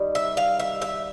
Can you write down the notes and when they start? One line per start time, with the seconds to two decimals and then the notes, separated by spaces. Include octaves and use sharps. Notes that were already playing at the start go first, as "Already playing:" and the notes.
Already playing: D#3 G3
0.15 E5
0.37 F5
0.60 E5
0.82 E5